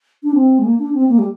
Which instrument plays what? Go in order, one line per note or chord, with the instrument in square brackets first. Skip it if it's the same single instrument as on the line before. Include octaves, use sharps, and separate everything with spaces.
[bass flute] D4
C4
G#3
A#3
D4
C4
A#3
G3